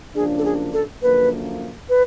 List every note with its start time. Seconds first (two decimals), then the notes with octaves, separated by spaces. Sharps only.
0.15 F#2 C#3 F3 A#3 D4 G#4
0.38 A4
0.45 G#4
0.73 A4
1.02 F#2 D3 F3 A#3 B4
1.89 B4